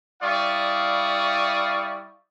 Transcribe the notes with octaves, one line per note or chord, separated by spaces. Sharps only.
G3 E4 D5 F5 C#6 D#6